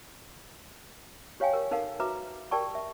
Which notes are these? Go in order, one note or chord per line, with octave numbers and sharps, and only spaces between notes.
G4 C#5 F5 G5 G#5
G4 A#4
D#4 A4 A#4 F5 F#5
F#4 B4 E5 A#5 D6
G4 A#4 D5 G5 A5 C#6
E5